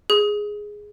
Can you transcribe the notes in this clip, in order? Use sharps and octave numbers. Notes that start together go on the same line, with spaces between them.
G#4